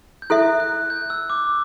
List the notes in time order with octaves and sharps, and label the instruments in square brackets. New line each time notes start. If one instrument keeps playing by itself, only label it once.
[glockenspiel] G6
[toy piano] E4 A4 E5 [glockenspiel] F#6
[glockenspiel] F#6
G6
E6
D6